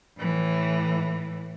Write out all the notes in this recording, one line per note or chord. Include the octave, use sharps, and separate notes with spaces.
A2 E3